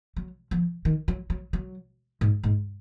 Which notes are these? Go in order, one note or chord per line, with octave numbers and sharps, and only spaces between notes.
F#3
F3
D#3
F#3
F#3
F#3
G#2
G#2